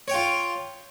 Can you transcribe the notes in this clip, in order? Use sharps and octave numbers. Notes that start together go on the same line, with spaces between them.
F4 C#5 G5